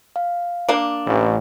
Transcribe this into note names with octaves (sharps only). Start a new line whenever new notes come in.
F5
A#3 D4
A1